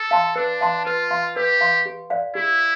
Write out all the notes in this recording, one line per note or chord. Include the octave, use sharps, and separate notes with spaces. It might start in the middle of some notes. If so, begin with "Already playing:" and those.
Already playing: A4
F5 A5 C6
D4 B4
F5 A5 C6
F4 B4
F5 C6
G4 B4
F5 C6
G4
D5 F5
E4 G4